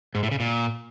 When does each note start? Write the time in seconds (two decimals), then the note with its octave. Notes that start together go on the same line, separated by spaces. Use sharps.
0.15 G#2
0.23 A2
0.31 C#3
0.40 A#2